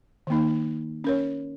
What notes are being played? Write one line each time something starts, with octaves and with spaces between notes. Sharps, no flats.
D#3 A#3 D#4
C#4 A#4 C#5